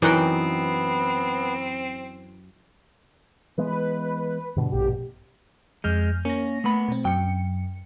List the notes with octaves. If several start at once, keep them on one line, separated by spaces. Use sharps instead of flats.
F#2 E3 B3 C4 D#4 F#5 G5
E3 G#3 B3 B4
G2 B2 D3
A#1 A2 G4
F2 G#3 F6 G6
A#3 C#4 A#6
A3 B3 B5
B2 C4
F#2 G5 C#7